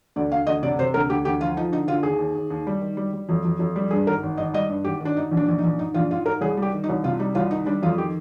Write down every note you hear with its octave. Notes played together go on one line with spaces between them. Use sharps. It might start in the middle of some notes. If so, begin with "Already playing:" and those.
D2 D5
D2 F5
D2 D#5
C3 D5
C3 C5
D2 A#4
D2 G4
D2 G4
F3 F4
F3 D#4
D3 D#4
D3 F4
D#2 G#4
D#2
D#2
D#2
G3
D#3
G3
G3
F2
F2
F2
G3
G2 G#4
G#1 A#4
G#1
G#1 D#5
G3 D#5
G2
G#1 G4
D#3 D4
G#2 D#4
A#1
D4
A#1
D#4
A#1
G#2 D#4
A#1 F4
G#2 F4
G#2 A#4
C2 G#4
G3
G4
D#3
D#4
C2
C3 F4
G3 D#4
C2 F4
D#3 D#4
G3 D4
F2 F4
D#3 G4